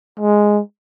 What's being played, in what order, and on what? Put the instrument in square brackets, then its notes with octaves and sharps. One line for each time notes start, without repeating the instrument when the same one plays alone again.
[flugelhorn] G#3